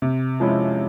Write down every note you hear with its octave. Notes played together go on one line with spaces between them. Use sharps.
C3
F3 G#3 C#4 E4